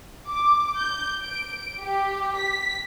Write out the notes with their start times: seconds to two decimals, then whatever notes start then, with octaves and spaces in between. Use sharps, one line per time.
0.28 D6
0.77 G6
1.22 D7
1.82 G4
2.38 B6